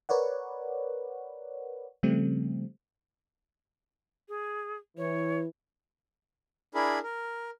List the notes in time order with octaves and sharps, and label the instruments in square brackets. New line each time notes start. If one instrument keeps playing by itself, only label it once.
[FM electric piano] A#4 B4 C#5 D5 F#5
C#3 F3 G3 A3 C4
[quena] G#4
[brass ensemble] E3 [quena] C#5
[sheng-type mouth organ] D4 E4 G#4 A#4 B5
A#4